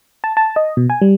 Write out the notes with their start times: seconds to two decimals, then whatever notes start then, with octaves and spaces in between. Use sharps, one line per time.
0.24 A5
0.37 A5
0.56 D#5
0.77 B2
0.90 G#5
1.01 G3